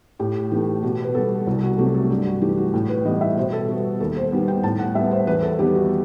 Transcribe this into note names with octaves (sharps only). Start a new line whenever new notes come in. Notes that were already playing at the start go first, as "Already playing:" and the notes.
A2 G4
E3 A3 G4
B2 G4
B4
G3 B3 A4
C2 F#4
F#4
C3 F#3 A3 G4
A4
G2 G4
F#4
E3 A3 G4
F#4
A2
B4
E3 G3 B3 D#5
E5
B2 C5
A4
G3 B3 F#4
D#2 A4
C5
D#3 G3 B3
G5
A2 A5
F#5
G3 B3 E5
C5
E2 B4
A4
D#3 G3 B3 G4
F#4